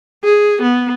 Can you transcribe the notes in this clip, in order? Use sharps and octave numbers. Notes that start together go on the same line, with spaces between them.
G#4
B3